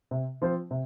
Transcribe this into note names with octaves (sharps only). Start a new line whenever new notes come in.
C3
F3 C4 F4 C5
C3